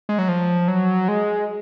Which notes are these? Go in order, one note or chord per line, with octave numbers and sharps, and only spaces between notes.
G#3
F#3
F3
F#3
G#3